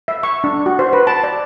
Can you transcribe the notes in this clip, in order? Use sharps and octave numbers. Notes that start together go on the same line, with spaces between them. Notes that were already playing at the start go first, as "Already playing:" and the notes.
E5
C#6
D4
F#4
C5
B4
A5
D5